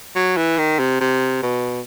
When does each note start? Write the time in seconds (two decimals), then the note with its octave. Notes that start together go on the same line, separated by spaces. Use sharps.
0.16 F#3
0.37 E3
0.58 D#3
0.79 C3
1.01 C3
1.43 B2